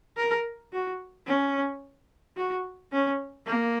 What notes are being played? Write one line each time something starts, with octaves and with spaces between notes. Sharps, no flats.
A#4
F#4
C#4
F#4
C#4
A#3